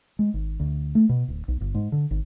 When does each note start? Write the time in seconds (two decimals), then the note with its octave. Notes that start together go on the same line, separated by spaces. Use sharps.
0.19 G#3
0.34 G#1
0.60 D2
0.95 A3
1.09 B2
1.28 D1
1.48 B1
1.61 G1
1.74 G#2
1.92 D3
2.11 G#1